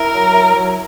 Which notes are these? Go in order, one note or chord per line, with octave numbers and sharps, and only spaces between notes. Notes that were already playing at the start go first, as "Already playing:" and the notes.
Already playing: E4 A#4
F#3
E4
F#3